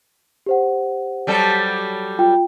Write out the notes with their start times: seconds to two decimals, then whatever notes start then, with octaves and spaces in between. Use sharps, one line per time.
0.46 G4 C5 F#5
1.27 F#3 G3 A4
2.19 F4 G5